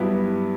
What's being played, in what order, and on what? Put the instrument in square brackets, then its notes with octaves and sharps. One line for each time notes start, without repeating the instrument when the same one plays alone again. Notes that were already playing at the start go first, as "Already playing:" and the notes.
Already playing: [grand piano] G2 F#3 B3 E4 G4